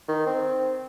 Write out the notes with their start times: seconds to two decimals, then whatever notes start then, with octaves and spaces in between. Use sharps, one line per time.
0.08 D#3
0.26 C4